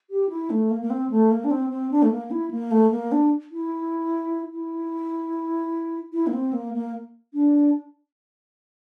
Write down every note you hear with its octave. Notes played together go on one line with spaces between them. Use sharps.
G4
E4
A3
A#3
A#3
C4
A3
A#3
D4
C4
C4
D4
A3
A#3
E4
A#3
A3
A#3
D4
E4
E4
E4
A#3
C4
A#3
A#3
D4